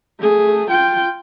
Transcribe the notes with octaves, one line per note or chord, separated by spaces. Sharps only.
A3 G#4
F4 G5